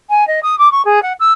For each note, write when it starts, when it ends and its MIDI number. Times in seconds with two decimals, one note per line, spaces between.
0.09 0.26 80
0.27 0.39 75
0.43 0.58 87
0.58 0.71 86
0.71 0.82 85
0.85 1.02 68
1.02 1.13 78
1.19 1.32 88